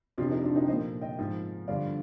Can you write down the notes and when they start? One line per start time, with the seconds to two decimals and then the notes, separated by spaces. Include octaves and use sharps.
0.18 F2 C3 F3 D4 F4
0.31 D#4
0.43 D4 F4
0.56 D#4 G4
0.68 A#2 F3 C5 D#5
1.01 D#5 G5
1.18 G#2 F3
1.68 G2 D3 F3 D5 F5